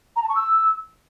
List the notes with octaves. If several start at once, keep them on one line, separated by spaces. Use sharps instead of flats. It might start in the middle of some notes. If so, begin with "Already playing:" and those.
A#5
A5
C#6
E6